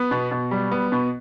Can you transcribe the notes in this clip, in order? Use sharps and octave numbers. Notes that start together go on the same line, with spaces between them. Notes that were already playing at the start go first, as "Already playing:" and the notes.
Already playing: B3
B2
B2
G3
B3
B2